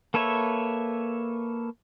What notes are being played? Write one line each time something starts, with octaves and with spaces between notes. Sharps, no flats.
A#3 A4 B4 C#5 E5